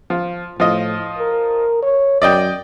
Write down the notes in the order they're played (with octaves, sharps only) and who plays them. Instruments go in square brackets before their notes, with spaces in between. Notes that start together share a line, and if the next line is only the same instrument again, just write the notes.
[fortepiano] F3
[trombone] A2 [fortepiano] F3 D#5
[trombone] A#4
C#5
[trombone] F#2 [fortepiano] D5 D#5 G5